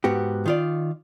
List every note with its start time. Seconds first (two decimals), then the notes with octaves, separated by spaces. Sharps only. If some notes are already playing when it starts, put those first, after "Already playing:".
0.04 G#2 B3 F#4 G4
0.46 D#3 F4 D5